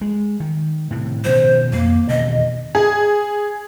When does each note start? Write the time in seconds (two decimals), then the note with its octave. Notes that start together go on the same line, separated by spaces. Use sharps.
0.01 G#3
0.40 D#3
0.91 A2 C3
1.24 B2 D#3 F3 C5
1.73 F2 A#3
2.08 E1 B2 D#3 D#5
2.75 G#4